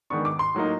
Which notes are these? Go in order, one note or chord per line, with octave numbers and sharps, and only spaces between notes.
D#3 G#3 B3 D4 C#6
D6
C6
A2 F#3 A#3 D#4